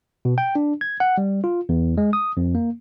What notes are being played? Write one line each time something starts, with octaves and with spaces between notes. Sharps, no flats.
B2
G5
D4
G#6
F#5
G3
F4
E2
G#3
D#6
F2
A#3